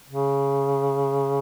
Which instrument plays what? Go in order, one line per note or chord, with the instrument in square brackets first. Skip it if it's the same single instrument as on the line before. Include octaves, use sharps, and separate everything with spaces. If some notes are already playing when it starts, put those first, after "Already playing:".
[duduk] C#3